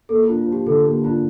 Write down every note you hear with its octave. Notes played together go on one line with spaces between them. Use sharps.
A#3 A4
D4 F4
F4
F3
G4
D3 A4
A#3 G4
D4 F4